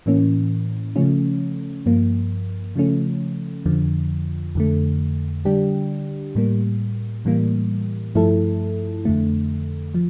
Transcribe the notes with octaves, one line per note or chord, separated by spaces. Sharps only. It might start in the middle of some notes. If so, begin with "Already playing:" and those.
A2 E3 A#3 C#4
C#3 F3 A3 C#4
G2 F3 A#3
C#3 F3 A3 C#4
F2 D3 F3
F2 D3 A3
D3 G3 D4 G4
A2 G3 A#3
A2 E3 G3 A#3
G2 F3 A3 E4 A4
F2 D3 A3
F3